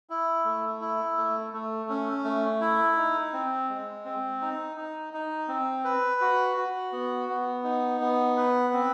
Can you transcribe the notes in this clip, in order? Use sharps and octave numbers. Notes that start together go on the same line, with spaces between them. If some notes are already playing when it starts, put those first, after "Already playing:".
E4
A3
E4
A3
A3
C#4
A3
E4
D#4
C4
G#3
C4
D#4
D#4
D#4
C4
B4
F#4
F#4
B3
B3
D#4
B3
B4
C4